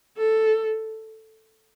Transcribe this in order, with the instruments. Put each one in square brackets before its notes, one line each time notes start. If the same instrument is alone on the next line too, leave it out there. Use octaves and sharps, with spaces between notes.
[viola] A4